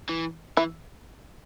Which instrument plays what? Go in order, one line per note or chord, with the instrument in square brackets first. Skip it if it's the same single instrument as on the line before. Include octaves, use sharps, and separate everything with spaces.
[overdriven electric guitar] E3
[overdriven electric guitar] E3 [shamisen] E4